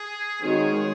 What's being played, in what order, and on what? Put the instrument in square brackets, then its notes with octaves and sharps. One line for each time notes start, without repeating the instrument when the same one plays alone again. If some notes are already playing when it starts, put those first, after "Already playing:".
Already playing: [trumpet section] G#4
[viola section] D#3 G#3 C4 F#4 C#5 [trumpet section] G#4